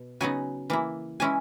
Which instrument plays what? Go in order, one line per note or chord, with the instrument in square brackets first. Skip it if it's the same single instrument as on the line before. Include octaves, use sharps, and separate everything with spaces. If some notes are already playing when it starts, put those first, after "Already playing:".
Already playing: [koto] B2
C#3 F#3 B3 D#4 G#5
E3 A#3 E4
E3 G#3 C#4 E4 G#5